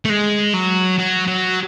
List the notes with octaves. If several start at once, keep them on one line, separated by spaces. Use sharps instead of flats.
A3
G#3
F#3
F#3
F#3